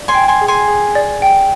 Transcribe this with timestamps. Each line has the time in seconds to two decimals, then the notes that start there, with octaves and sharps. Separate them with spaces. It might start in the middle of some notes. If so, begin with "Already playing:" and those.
Already playing: D5
0.08 G#5 C6
0.14 G5
0.28 G#5 C6
0.41 G#4
0.48 G#5 C6
0.68 G#4
0.95 D5
1.22 G5